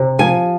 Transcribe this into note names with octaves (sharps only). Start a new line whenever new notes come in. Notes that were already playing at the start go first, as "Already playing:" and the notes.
Already playing: C3
F3 G#5